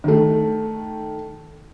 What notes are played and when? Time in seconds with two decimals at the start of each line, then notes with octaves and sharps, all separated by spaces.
0.04 D#3 A3